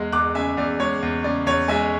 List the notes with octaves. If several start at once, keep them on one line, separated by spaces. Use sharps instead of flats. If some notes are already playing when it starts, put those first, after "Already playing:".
Already playing: E2 G#3
E2 D6 F#6
C#3 E5 G#5
E2 D5
G#3 C#5
E2
C#3 D5
E2 C#5
G#3 E5 G#5